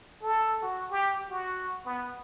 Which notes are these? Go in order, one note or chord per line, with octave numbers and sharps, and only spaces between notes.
A4
F#4
G4
F#4
B3